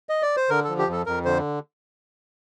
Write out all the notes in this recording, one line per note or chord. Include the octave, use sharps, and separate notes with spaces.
D#5
D5
C5
D3 A#4
F3 A4
G4
F2 A4
F2 A#4
D3 C5